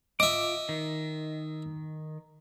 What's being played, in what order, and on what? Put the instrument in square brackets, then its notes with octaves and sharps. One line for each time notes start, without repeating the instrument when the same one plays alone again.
[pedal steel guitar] F4 D6 [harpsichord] D#5 E5
[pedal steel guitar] D#3